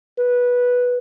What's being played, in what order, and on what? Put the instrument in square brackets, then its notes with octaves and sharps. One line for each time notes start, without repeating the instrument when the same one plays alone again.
[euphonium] B4